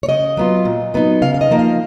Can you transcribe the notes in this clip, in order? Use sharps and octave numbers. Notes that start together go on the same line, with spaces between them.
C#5
C#3 D#5
F#3 B3 F4
A#2
F#3 B3 D#4
C#3 F5
F5
D#5
F3 A#3 D#4
F5